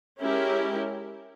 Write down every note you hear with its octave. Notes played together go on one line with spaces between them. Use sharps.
G#3 C#4 E4 G4 A#4